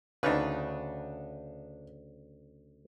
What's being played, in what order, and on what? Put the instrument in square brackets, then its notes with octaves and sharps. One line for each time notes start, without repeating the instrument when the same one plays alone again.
[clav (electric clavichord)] D2 C#3 [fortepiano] D4 D#4 B4